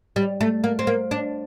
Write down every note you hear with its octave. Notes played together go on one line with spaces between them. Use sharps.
G3
A3
A#3
C4
A#3
D4